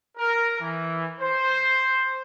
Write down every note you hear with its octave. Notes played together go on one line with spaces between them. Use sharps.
A#4
E3
C5